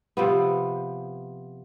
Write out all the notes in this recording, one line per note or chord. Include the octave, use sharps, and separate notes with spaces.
C3 F3 B3